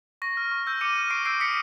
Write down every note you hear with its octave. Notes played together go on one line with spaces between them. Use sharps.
C#6 A#6
F6
C#6
E6 G6
D6 C#7 D#7
F6
C#6 C7 D7
E6 G6 C7 D7
D#6 B6 C#7